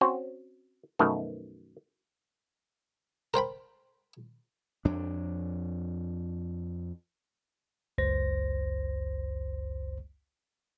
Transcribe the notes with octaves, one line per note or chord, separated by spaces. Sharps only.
C4 C#4 F#4 C5
F#2 B2 D#3 F3 A3
A#4 C5 G5 B5
F2 D4
G#1 C#2 F#2 C5 A#6